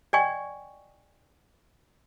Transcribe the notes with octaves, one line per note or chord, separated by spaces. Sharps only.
D5 D#5 G5 G#5 C#6